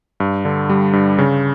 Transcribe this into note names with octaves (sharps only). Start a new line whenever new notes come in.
G2
D3
G3
G2
C#3